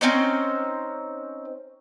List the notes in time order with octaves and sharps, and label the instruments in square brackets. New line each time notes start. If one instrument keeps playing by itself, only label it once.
[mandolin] C4 C#4 D#4 C5